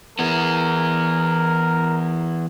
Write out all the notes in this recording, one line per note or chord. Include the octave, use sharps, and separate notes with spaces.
E3 B3 A#4